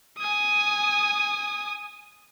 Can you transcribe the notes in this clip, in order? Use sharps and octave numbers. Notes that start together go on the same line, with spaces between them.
G#5 D#6